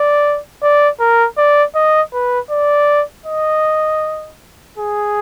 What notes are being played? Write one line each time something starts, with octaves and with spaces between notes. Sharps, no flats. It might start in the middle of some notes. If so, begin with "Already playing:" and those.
Already playing: D5
D5
A#4
D5
D#5
B4
D5
D#5
G#4